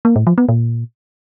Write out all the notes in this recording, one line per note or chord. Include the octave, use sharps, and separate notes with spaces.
A#3
A2
F3
B3
A#2